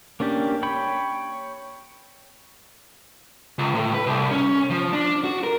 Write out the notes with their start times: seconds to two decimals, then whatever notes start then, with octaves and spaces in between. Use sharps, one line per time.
0.20 A#3 C#4 D4 G4
0.63 C#5 G5 B5
3.59 C#2
3.75 A2
3.94 B4
4.06 C2
4.31 C#4
4.70 F3
4.93 D4
5.24 F#4
5.43 A#4